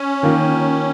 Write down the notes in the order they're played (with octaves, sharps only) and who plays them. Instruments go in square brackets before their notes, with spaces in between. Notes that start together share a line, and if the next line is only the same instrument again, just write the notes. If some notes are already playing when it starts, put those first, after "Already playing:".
Already playing: [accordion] C#4
[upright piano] D#3 A#3 F4